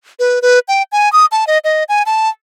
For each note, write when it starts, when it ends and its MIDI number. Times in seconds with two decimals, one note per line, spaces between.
0.19 0.42 71
0.42 0.59 71
0.68 0.83 79
0.92 1.11 80
1.13 1.26 87
1.32 1.45 81
1.47 1.58 75
1.64 1.84 75
1.89 2.03 80
2.06 2.29 81